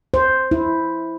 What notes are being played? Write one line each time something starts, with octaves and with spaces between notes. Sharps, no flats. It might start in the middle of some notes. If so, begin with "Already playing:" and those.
C5
E4